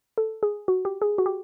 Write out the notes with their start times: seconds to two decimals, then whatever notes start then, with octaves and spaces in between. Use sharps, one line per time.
0.18 A4
0.43 G#4
0.68 F#4
0.85 G4
1.02 G#4
1.18 F#4
1.26 G4